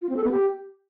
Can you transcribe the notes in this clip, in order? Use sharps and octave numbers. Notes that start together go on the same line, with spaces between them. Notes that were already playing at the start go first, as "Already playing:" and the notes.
F4
C4
A4
B3
G4